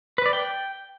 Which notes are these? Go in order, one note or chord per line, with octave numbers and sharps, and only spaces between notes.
B4
D5
G5